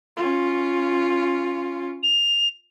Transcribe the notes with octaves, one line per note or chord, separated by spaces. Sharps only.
C#4 F4
F7